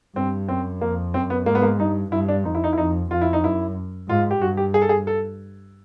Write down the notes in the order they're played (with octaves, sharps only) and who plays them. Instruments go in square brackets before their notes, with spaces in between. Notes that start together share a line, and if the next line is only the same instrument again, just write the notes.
[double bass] G2 [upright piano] C4
[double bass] F#2 [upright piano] C4
[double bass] F2 [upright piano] A#3
[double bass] F#2 [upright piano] C4
[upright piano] B3
[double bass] G#2 [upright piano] A#3
[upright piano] B3
A#3
[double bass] G2 [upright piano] D#4
[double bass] G2 [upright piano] E4
[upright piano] D4
[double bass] F2 [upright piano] D#4
[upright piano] E4
D#4
E4
[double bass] F2 [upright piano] D#4
[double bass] F2 [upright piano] F4
[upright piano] E4
D#4
[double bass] F#2 [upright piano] E4
[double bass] G#2 [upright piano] F4
[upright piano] G4
[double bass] G2 [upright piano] F#4
[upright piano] G4
G#4
A4
G#4
A4